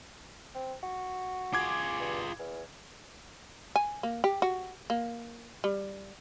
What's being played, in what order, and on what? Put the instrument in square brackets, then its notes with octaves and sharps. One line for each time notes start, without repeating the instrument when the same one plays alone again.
[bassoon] C4
F#4
[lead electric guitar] F4 G#4 [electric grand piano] D6 G#6
[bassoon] G2
E2
[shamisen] G#5
A#3
G4
F#4
A#3
G3